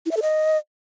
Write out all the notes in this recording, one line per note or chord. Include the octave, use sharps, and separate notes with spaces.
E4
E5
A4
D#5